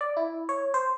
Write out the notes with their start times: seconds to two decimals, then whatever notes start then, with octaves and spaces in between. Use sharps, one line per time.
0.01 D5
0.17 E4
0.49 C#5
0.74 C5